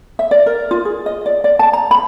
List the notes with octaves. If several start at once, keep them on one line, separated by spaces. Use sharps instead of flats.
E5
D5
A#4
F4
G#4
D#5
D5
D5
A5
A#5
B5